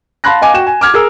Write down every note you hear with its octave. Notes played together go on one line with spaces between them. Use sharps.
F5 A5 B5 C6 F#6 A#6
D#5 F5 G#5 D6
F#4 G5 E7
G#5
D6 F6 G#6
G#4 A#4 E6